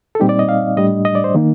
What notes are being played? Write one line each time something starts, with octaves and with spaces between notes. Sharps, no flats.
A4
A#2 G3 C4 D#4 G4
D5
D#5
F5
A2 G3 D4 D#5
D#5
D5
C5
D#3 A#3 D#4